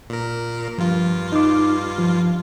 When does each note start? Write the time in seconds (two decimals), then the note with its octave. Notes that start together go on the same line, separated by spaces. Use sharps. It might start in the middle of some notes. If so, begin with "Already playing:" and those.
0.10 A#2 A#4
0.78 G2 F3 F4
1.32 D#4 D6
1.98 F3